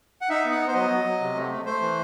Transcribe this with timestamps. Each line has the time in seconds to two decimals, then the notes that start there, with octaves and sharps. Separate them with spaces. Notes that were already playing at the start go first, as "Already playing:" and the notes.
0.21 F#5
0.29 D#4 E5
0.45 B3
0.51 F#5
0.59 B3
0.67 C5
0.74 F#3 D#5
0.90 F#3
1.05 F#3
1.21 C3
1.35 A3
1.50 A3
1.66 A3 C5
1.81 E3